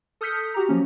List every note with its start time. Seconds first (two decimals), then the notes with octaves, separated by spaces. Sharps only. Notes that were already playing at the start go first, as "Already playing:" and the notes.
0.21 A4 D#6 F6 G6 B6 C#7
0.54 F#4 G4 A#5
0.69 F3 F#3 A#3 C#4